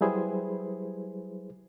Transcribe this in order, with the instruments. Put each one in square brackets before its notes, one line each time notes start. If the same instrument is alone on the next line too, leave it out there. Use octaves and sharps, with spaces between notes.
[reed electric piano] F#3 G3 E4 G#4 B4 C5